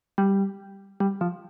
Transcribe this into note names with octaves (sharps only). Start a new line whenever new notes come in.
G3
G3
F3